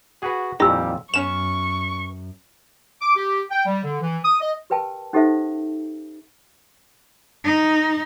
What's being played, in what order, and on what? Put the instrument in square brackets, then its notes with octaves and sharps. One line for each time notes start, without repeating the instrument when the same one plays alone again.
[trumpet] F#4 [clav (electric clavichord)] G#4 B4
[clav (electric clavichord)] F2 A#2 D#3 [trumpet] G3 [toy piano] E4 E6 [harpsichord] G4
[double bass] F#2 [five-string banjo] B3 C#4 C#5 [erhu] C#6 [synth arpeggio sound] E7
[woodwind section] D6
G4
G5
G3
D3
E3
D#6
D#5
[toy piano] G4 A#4 B4 G5 A5
C#4 D#4 G4 A4 C5 E5
[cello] D#4